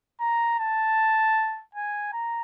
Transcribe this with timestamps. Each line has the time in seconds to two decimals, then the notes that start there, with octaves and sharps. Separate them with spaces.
0.21 A#5
0.59 A5
1.75 G#5
2.13 A#5